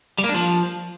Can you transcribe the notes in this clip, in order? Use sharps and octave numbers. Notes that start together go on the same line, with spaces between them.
G3
A#3
D4
F3